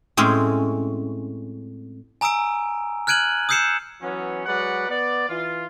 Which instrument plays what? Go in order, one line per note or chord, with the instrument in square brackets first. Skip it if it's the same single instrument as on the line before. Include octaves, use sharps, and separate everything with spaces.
[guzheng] A2 G#3 C4 C#4
[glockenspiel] G#5 A#5 D#6 E6 D7
F6 F#6 G#6 D7 D#7 F#7
D#6 E6 G6 C7 C#7 E7
[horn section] E3 F#3 B3 C#4
F#3 G#3 B4 D5 F#5
B3 D5
E3 F4